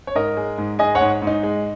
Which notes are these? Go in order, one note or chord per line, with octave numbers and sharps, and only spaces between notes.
C#5
G#2 A#4 D#5
G#3
G#2
G#3 D#5 G#5
C#5 F#5
G#2
G#2
D#4
G#3